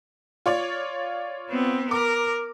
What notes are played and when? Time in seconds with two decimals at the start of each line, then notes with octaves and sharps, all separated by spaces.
0.46 F4 C#5 D5
1.50 B3 C4
1.91 A#4 D6